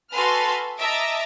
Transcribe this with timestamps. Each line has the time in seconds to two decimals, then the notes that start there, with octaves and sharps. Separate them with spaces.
0.12 F#4 A4 B4 G#5 C6 F6
0.78 D#5 E5 A5 A#5 D6 D7